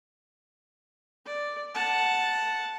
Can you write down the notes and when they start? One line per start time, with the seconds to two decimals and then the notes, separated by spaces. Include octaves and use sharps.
1.25 D5
1.74 F#5 A5